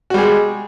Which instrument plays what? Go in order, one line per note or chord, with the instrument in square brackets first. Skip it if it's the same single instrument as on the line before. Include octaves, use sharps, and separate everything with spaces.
[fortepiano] F#4
G3
G#4
G#3